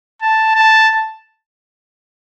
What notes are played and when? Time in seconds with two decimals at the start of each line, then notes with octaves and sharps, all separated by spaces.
0.22 A5
0.56 A5